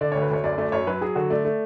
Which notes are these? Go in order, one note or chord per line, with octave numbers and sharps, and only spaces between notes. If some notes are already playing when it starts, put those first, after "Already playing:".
D3 D5
D2 C#5
B4
D2 C#5
F#2 D5
A3 D5
F#2 C#5
F#3 B4
F#3 G#4
D3 F#4
A3 D5
A3